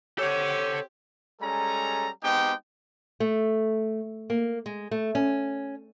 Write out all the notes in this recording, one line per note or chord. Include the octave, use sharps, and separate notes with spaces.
C4 G4 A4 C#5 F#5
G3 G#3 C#4 A4 A#5
G#3 B3 C4 D#4 G4 G5
A3
A#3
G#3
A3
C#4